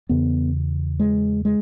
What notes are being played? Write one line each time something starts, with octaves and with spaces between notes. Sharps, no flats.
E2 C#3 B3
G#3
G#3